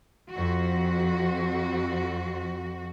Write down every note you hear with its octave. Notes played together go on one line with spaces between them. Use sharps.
F2 F#4